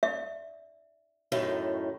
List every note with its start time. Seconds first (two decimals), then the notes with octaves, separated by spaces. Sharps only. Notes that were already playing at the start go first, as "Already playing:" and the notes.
0.03 D5 E5
1.32 F#2 A2 D#3